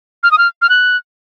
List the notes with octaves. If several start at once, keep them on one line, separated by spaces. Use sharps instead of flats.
F6
D#6
F6
F6
F#6